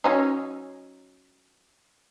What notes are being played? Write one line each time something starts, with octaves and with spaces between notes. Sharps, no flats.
F#3 C#4 D#4